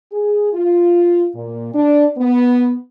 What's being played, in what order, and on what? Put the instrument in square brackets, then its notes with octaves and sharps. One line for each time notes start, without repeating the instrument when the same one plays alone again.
[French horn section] G#4
F4
A#2
D4
B3